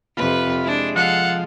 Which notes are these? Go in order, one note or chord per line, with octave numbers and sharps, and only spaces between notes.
F2 C3 F4 B4 B5
G#3 D4 E4
F3 A4 F5 F#5